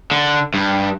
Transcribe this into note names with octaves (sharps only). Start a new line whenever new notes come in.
D3
G2